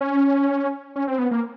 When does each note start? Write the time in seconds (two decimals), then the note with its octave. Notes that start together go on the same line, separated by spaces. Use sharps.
0.01 C#4
0.96 C#4
1.07 C4
1.19 B3
1.31 A#3